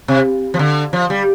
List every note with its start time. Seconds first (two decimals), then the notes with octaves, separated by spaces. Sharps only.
0.08 C3
0.54 F3
0.59 D3
0.93 F3
1.10 G3